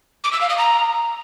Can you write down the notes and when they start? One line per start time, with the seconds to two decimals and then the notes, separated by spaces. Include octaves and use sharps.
0.24 D6
0.33 E6
0.41 F5
0.49 D#6
0.58 A#5